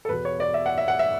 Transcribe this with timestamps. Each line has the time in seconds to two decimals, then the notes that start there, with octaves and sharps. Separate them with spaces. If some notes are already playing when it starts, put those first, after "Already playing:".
0.05 A4
0.09 E2 B2 B4
0.25 C#5
0.40 D5
0.54 E5
0.66 F#5
0.78 E5
0.88 F#5
0.99 E5